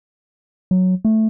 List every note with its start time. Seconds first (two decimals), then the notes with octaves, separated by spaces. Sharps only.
0.71 F#3
1.05 A3